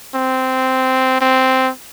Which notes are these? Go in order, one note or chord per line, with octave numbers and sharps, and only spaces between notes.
C4
C4